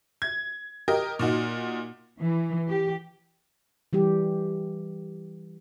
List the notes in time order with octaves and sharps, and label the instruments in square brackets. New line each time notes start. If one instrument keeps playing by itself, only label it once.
[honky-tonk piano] G#6
G4 A#4 D#5
A#2 D#4 F#4
[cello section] E3
G4
[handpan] E3 G3 G4